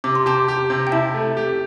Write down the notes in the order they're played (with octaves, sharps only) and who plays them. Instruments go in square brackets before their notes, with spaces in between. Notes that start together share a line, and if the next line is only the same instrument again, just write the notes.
[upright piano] C3 [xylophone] D6
[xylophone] C6
[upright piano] G4 [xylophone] A5 D6
[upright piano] G4
C3
[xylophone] G5
[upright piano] E4 [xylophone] E5 A5
[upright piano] A3
G4